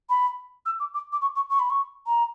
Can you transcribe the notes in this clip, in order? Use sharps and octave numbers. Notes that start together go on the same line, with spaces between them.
B5
E6
D6
D6
D6
C#6
C#6
C#6
B5
C#6
A#5